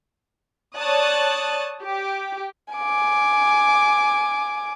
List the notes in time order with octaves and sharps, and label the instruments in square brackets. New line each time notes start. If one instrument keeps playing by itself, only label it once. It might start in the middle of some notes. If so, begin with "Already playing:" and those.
[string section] C#5 D5 A5 D#6 F#6
G4
[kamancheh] G#5 D6